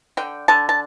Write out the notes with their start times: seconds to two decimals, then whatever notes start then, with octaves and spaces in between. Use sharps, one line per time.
0.17 D3 G5
0.48 D3 A5
0.69 A5